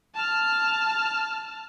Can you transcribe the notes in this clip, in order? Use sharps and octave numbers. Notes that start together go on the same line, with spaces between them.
A5 F6